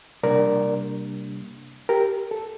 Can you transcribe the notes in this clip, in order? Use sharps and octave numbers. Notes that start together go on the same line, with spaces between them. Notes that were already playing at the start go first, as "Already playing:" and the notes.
C3 G3 A#3 D4 A#4 D5
G4 A#4
A4